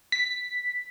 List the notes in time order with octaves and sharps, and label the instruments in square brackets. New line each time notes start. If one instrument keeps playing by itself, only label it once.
[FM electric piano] B6